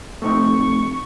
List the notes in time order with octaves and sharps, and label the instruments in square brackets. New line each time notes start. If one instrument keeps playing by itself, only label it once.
[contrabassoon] F1 [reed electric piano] A3 C4 D#4 [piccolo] C#6